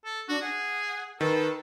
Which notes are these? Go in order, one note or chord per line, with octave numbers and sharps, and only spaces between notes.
A4
D4 F#4
G#4 F#5
D#3 A4 B4